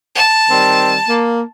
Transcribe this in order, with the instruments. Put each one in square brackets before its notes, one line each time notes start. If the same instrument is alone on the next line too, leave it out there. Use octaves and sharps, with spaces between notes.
[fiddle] A5
[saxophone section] D#3 G3 C4
A#3